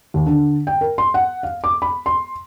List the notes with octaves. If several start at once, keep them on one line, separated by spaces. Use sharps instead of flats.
D#2
D3
G5
A#4
C6
F#5
F5
D6
B5
C6